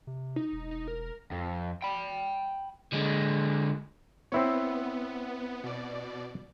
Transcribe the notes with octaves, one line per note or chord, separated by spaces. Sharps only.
C3
D#4
E1
D#4
A#4
F2
G5 B5
D3 G#3
B3 C4 E4 C#5
B2 D5